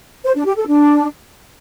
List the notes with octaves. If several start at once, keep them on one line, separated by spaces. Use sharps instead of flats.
C5
D4
G4
A4
D4